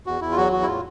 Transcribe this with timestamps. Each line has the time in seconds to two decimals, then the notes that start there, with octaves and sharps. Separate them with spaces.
0.06 E2 F#4
0.21 E2 E4
0.31 F4
0.37 F#3 F#4
0.52 E2 F#4
0.63 E4
0.67 A2 F4